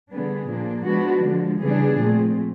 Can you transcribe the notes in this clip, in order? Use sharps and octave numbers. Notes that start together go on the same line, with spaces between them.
D3 G3 B3 D4 G#4
A#2 F3 A#3 D4
F3 G#3 B3 D4 F#4
D3 F3 G#3
C#3 E3 G3 B3 D4 G#4
A#2 F3 A3 C4